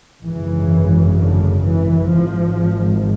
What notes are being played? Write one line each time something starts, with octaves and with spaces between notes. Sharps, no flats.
G#1 F#2 C#3 E3
D3
E3
G#1 G#2 F3